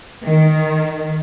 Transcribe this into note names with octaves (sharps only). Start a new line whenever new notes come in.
D#3